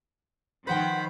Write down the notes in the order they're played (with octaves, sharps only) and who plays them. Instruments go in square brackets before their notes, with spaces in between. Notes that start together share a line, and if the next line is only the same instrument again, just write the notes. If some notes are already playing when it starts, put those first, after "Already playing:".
[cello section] D#3 F3 [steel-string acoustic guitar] B4 F#5 G5 [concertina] C5 B5